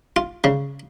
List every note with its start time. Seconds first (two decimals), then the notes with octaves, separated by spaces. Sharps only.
0.16 F4
0.44 C#3